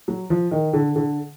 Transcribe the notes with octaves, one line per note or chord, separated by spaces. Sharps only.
F#3
F3
D#3
D3
D3